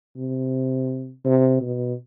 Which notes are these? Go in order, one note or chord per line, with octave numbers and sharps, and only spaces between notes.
C3
C3
B2